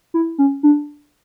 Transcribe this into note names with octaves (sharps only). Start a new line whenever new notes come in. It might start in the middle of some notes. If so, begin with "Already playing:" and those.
E4
C#4
D4